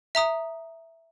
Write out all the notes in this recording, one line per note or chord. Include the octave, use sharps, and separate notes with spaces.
E5 A#5 D#6